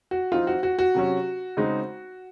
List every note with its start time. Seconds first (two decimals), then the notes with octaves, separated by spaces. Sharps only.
0.11 F#4
0.32 F3 C4 D#4 F4
0.47 F#4
0.63 F#4
0.79 F#4
0.95 C3 F#3 C#4
1.57 C#3 G#3 C4 D#4